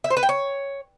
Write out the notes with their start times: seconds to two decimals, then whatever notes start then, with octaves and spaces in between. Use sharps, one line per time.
0.04 E5
0.10 C5
0.17 B4
0.23 G5
0.29 C#5